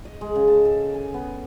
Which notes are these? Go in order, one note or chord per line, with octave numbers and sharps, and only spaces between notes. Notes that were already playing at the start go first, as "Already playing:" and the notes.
D#5
G#3
C#3
A5
A4
G#5
B3